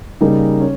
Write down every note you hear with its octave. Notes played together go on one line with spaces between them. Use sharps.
C#3 G3 A#3 D#4 G#4
C#4